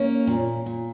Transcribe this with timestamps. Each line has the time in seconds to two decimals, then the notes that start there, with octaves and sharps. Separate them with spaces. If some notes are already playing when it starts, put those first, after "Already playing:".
Already playing: A#3 C#4
0.27 A#2
0.66 A#2